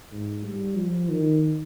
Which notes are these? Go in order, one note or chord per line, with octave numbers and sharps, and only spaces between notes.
G#2
G3
F3
D#3